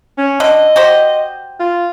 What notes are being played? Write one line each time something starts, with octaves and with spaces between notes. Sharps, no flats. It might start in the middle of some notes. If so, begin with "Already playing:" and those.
C#4
D3 D#5
F#4 G4 C5
F4